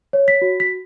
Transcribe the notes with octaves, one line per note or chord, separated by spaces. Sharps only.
C#5
B6
F#4
B6